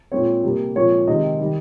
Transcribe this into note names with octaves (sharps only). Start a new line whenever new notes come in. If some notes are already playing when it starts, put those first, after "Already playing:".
A#2 G#3 C4 C#5
C3 G3 A#3
A#2 F3 G#3 C4 C#5
C3 D#3 G#3 C4 D#5
D#3 G3